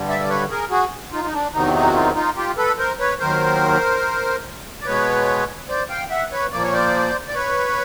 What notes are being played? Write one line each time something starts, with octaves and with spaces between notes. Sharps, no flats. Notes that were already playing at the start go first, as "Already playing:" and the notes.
Already playing: G2 D3 G3
D5 E5
D5
B4 C#5
G#4 A#4
F#4 G#4
D#4 F4
D#4
D4
E2 C3 D#3 F#3 D#4
D#4
F#4
D#4 F4
D#4 F4
F4 G4
A4 B4
A#4 C5
B4 C#5
D#2 D#3 F#3 A#4 C5
D5
B2 G#3 B3 B4 C#5
C5 D5
F5 G5
E5 F#5
B4 C#5
A#2 F3 A#3 D5
C#5
C5 D5
D5
B4 C#5